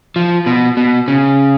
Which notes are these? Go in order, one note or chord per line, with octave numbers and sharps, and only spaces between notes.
F3
B2
B2
C#3